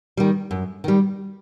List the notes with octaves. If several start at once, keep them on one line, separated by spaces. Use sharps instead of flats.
D#3 G3
F#2
D#3 G3